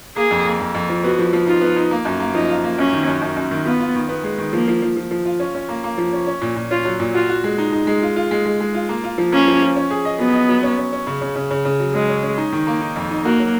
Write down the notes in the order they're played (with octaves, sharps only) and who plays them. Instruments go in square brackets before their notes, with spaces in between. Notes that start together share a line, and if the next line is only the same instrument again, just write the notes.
[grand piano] A#3 [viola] G#4
[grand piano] F2
A#3
F2
F2
F3
[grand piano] B3 [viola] F#4
[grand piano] F3
F3
[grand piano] D#4 [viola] F4
[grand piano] B3
D#4
A#3
F#2
A#3
[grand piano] F3 [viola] D#4
[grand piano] F4
A#3
[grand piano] F#2 [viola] C#4
[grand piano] D#3
F#2
F#2
F#2
D#3
[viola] B3 [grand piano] F4
[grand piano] F4
D#3
B3
G#3
D#3
[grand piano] F3 [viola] A#3
[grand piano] F3
F3
F3
F3
F4
C#4
C#4
A#3
A#3
F3
C#4
C#4
A#2
A#2
[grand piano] C#4 [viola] F4
[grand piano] F#3
A#2
[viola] F4 [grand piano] F#4
[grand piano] F#4
G#3
D#4
D#4
G#3
F4
F4
G#3
G#3
G#3
F4
A#3
F4
F3
[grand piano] A#3 [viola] C#4
[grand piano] F3
F3
C#4
G#4
D#5
[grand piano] F#3 [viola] B3
[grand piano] D#5
F#3
C#4
C#4
C#4
C#3
C#3
C#3
C#3
C#3
F#3
[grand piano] F#3 [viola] G#3
[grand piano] C#4
C#4
D#4
D#3
A#3
D#4
F2
D#4
[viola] A#3 [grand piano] F#4
[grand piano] F#3